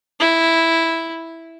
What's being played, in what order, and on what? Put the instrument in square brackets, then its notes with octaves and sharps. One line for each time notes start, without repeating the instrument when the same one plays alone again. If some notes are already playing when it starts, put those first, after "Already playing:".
[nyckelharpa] E4